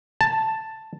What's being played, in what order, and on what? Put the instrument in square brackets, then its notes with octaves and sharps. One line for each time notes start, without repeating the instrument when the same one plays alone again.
[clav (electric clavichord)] A5